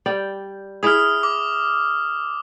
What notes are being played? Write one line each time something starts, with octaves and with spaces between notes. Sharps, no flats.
G3 D5 G5
E4 G#4 D#6 F6
D6